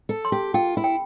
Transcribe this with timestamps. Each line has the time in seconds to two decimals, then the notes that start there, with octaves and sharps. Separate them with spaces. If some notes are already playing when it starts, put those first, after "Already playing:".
0.09 A4
0.25 C6
0.32 G4
0.54 F4 G5
0.77 E4
0.84 G5